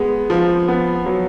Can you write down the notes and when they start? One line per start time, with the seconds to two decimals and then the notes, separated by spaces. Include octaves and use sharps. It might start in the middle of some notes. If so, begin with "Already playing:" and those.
Already playing: G#3 B3
0.30 F3
0.68 B3
1.06 F#3